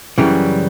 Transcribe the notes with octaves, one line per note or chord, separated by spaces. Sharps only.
F#2 C#3 E3 G3